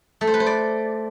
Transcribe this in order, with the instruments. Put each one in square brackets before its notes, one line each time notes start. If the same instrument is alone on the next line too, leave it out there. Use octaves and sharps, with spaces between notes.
[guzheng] A3
C5
B4
C5
D5